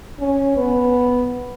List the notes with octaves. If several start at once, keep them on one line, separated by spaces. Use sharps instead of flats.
C#4
B3